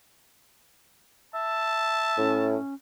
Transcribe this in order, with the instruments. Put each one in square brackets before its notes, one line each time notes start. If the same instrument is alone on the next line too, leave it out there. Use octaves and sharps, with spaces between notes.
[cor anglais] E5 [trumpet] A5
[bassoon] A2 [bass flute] C#4